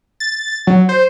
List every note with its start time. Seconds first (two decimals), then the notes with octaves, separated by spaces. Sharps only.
0.20 A6
0.67 F#3
0.89 C5